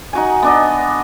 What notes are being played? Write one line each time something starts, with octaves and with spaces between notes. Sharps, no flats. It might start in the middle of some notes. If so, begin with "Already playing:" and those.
D#4 F#4 G#5
B3 D4 D#5